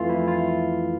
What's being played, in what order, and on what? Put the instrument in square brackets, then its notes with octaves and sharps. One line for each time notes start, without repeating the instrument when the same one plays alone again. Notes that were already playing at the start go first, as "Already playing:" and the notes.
Already playing: [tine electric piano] F2 E3 A3 F4
E4
F4